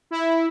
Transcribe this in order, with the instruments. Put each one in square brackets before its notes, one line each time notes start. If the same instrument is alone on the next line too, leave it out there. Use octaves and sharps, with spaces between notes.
[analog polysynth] E4